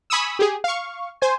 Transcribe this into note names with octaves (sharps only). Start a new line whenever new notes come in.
G#5 B5 C#6 D#6 E6
G4 G#4
F5 C#6
C5 G#5